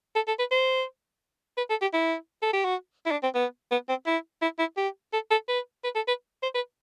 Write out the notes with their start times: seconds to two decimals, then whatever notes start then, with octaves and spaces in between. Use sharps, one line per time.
0.15 A4
0.27 A4
0.39 B4
0.51 C5
1.57 B4
1.70 A4
1.81 G4
1.93 E4
2.42 A4
2.53 G4
2.64 F#4
3.06 E4
3.11 D4
3.23 C4
3.35 B3
3.71 B3
3.89 C4
4.06 E4
4.42 E4
4.59 E4
4.77 G4
5.13 A4
5.31 A4
5.48 B4
5.84 B4
5.95 A4
6.08 B4
6.43 C5
6.55 B4